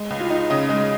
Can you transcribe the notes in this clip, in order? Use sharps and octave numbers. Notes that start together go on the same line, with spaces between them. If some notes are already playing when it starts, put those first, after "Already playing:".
Already playing: G#3
C#2
F4
D#4
C#3 D#5
G#3